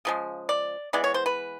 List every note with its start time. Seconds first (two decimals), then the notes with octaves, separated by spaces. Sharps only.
0.05 C#3 F3 G#3
0.49 D5
0.93 E3 G#3 B3 D5
1.04 C#5
1.14 C5
1.26 B4